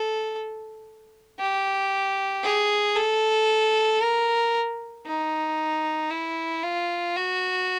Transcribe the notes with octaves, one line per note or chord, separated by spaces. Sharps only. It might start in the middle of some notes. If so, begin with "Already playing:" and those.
Already playing: A4
G4
G#4
A4
A#4
D#4
E4
F4
F#4